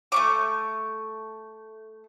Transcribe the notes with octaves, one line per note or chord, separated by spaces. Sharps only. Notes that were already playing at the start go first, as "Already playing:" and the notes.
A3 C#6 D6